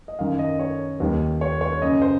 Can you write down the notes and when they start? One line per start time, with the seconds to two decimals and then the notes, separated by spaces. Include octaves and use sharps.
0.08 D#5
0.19 F#2 D#3 F5
0.39 D#5
0.59 C#5
1.00 D#2 D#3
1.41 C#5
1.61 C#5
1.81 F#2 C#3 D#5
2.02 C5